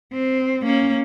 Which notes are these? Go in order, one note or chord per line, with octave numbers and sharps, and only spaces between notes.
C4
A#3 C#4